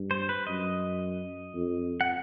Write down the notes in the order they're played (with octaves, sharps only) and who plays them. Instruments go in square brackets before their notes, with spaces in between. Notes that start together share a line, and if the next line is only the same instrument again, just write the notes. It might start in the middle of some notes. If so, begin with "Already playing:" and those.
Already playing: [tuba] G2
[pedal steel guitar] C5
B4
[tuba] F#2 [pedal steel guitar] D#5
[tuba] F2
[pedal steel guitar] F#5